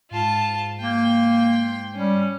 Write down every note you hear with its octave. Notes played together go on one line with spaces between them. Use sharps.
G#2 F4 A5
A#3 G5 C6
G3 C#4